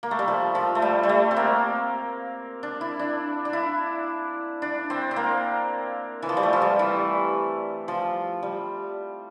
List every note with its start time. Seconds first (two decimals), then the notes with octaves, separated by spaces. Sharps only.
0.03 A#3
0.11 A3
0.19 G3
0.28 F3
0.55 F3
0.75 A3
0.82 G3
1.03 G3
1.09 A3
1.31 C4
1.37 A#3
2.63 D4
2.81 E4
2.99 D4
3.45 D4
3.53 E4
4.62 D4
4.90 C4
5.11 C4
5.16 A#3
6.22 E3
6.29 F3
6.37 G3
6.43 A3
6.53 F3
6.62 G3
6.79 E3
7.88 F3
8.43 G3